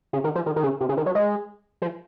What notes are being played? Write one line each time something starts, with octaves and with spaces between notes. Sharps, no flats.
C#3
D#3
F3
D#3
D#3
C#3
C3
C#3
D#3
F#3
G#3
F3